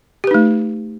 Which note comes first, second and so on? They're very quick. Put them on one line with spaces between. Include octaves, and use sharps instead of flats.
G4 B4 D#4 A3